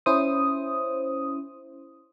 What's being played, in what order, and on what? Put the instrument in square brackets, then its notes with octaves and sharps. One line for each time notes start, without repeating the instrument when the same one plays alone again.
[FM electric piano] C#4 E4 C5 D#6